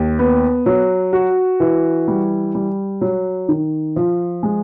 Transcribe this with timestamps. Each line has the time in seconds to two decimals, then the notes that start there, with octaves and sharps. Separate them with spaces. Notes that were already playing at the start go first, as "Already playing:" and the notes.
Already playing: D#2
0.19 B3
0.66 F#3
1.13 F#4
1.60 E3
2.08 G3
2.55 G3
3.01 F#3
3.49 D#3
3.96 F3
4.43 G#3